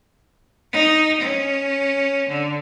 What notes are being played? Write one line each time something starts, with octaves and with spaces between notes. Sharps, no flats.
D#4
C#4
D3